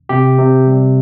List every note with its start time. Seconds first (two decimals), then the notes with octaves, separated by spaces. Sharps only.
0.09 C3 G4
0.39 C3
0.67 G3